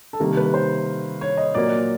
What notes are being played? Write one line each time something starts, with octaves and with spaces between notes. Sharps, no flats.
A4
C3 D#3 G3 A#3 A#4
B4
C5
C#5
D#5
A#2 F#3 A#3 D5